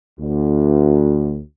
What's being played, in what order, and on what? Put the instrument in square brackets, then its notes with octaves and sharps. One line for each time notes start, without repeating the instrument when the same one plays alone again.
[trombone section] D2